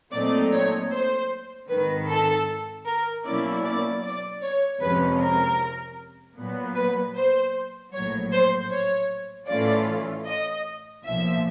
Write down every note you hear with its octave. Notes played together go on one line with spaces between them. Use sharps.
A#2 F#3 A3 C4 D#4 D5
C#5
C5
G#1 G#2 D#3 B4
A4
A#4
B2 F#3 A#3 C#4 E4 D5
D5
D5
C#5
F2 C3 F3 G#3 C#4 B4
A#4
A#2 F#3 B3
B4
C5
A#1 A2 F#3 C#5
C5
C#5
A2 E3 A3 C#4 F4 D5
D#5
B1 A#2 F3 E5